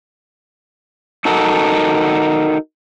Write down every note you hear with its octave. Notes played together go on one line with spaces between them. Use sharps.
D#4 F#4 A4 A#4